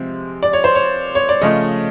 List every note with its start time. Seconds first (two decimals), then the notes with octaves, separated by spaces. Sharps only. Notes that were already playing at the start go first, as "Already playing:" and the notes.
Already playing: C3 F3 G#3 C4
0.43 D5
0.53 C#5
0.64 C5
0.75 C#5
1.15 C#5
1.29 D5
1.41 C#3 F3 A3 D#5